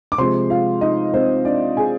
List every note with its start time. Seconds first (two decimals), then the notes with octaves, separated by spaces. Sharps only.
0.12 D6
0.18 C3 F3 G#3 C5 C6
0.50 F4 F5
0.81 D#4 D#5
1.14 C4 C5
1.45 D4 D5
1.77 G#4 G#5